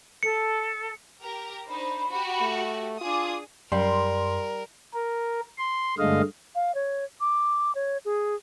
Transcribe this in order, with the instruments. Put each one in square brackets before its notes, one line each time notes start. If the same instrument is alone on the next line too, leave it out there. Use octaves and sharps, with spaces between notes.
[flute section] A4 [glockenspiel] C#7
[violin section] G4 A#4 A#5
[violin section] D4 D#4 C5 [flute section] B5
[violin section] F#4 G4
[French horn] A3
[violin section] D4 G#4 D#6 [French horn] F4 [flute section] D6
[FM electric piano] F#2 C6 [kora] G3 [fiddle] A#4
[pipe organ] A#4
C6
G2 D3 G#3 A3 D#5 F5
[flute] F5
C#5
D6
C#5
G#4